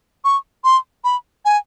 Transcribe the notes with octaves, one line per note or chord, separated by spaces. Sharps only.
C#6
C6
B5
G#5